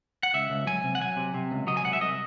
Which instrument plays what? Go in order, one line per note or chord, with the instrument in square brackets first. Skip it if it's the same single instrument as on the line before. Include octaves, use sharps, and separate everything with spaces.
[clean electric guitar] F#5
C#2 E5
C#2
F#3 G#5
C3
F#5
F#3 G#5
C3
C3
C#2
F#3 D#5
G#5
C2 F#5
E5
C2 D#5